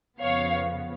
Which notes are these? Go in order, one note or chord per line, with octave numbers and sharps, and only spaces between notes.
F2 C#3 F3 B3 C#5 F5